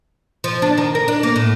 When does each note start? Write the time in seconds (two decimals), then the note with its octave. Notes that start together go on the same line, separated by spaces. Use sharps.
0.44 F3
0.62 D4
0.78 D#3
0.95 A#4
1.08 D4
1.23 A#3
1.36 A2